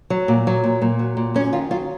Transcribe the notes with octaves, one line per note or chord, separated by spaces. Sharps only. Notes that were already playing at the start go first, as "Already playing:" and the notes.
F#3
A#2
F#3
A#2
A#2
F#3
A#2
F#2 C#4
D#3 F4
F#3 F4